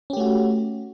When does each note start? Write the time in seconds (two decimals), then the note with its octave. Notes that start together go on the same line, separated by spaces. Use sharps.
0.10 C#4
0.13 G4
0.17 A3
0.20 F#4